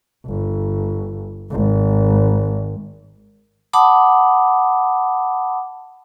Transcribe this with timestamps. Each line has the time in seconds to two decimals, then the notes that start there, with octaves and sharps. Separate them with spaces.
0.26 G1
1.51 G#1
3.73 F#5 A5 B5 D6 D#6